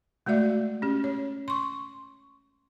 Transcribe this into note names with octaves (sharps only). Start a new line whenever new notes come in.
G#3 A3 F#4 D5 E5
C#4 G4
C#5
C6 C#6